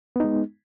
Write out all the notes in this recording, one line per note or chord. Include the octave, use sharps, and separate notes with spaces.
G#3 B3 D#4